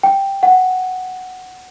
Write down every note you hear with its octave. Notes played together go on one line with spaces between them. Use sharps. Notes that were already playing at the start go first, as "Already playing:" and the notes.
G5
F#5